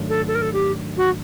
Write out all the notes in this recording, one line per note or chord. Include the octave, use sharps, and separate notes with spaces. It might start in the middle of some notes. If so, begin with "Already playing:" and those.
Already playing: G#2 D#3 F#3 A3 D4
A4
A4
A#4
A4
G4
F#4